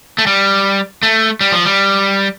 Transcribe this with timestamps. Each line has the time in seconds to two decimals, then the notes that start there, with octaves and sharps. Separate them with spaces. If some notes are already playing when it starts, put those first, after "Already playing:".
0.18 A3
0.27 G3
1.03 A3
1.41 G3
1.52 F3
1.65 G3